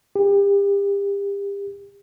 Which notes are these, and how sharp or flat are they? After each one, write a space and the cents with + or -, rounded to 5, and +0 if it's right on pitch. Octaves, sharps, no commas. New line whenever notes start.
G4 +35